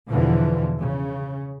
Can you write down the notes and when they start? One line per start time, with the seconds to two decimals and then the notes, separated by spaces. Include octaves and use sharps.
0.10 E2 B2 D3 E3 F3
0.80 C#3